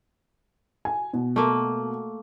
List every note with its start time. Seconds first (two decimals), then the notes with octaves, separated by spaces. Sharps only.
0.85 G#5
1.13 B2
1.36 A3 A#3